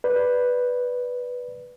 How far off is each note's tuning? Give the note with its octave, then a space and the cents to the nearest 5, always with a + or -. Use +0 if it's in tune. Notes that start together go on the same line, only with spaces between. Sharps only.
B4 +0 D5 +0